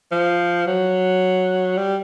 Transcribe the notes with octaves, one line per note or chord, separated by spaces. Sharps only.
F3
F#3
G3